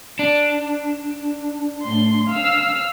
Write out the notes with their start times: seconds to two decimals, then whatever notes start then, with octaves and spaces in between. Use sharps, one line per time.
0.19 D4
1.82 A2 C6
2.29 F5 E6 F6